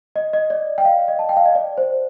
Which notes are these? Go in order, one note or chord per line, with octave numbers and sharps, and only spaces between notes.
D#5
D#5
D5
G5
F5
D#5
A5
G5
F5
D#5
D5
C5